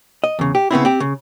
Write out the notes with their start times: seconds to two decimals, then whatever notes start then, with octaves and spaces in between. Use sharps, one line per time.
0.24 D#5
0.39 E2 C#3
0.55 G4
0.71 C#3 B3 C4 E4
0.85 C4 G4
1.00 C#3